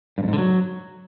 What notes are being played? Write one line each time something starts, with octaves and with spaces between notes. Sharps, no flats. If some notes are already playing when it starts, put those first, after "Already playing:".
G2
F2
G#2
D3
F#3